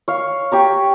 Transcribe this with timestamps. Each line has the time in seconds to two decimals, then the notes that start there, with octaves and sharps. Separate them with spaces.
0.08 C#5 F5
0.52 G4 C#5 A#5